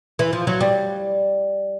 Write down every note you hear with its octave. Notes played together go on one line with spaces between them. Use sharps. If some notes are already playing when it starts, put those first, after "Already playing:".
E3
F3
F#3
G3